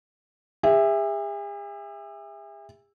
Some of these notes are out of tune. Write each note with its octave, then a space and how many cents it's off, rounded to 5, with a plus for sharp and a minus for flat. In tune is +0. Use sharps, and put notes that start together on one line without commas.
G#4 -45 E5 +0